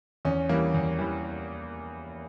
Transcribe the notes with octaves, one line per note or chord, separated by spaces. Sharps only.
E2 C#4
E3 G3 A#3
E2
E3 G3